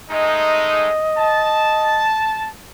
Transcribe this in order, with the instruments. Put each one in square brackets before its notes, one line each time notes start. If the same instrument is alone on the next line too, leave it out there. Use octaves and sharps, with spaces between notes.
[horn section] G#3 A3 D#4 [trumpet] D#5
[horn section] A5